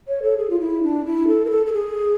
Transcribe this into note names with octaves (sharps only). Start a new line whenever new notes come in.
C#5
A4
G#4
F4
E4
D4
E4
A4
A#4
A4
A4
G#4